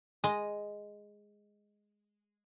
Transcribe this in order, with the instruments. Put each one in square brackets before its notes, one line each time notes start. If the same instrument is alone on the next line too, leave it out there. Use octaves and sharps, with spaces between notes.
[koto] G#3 D#5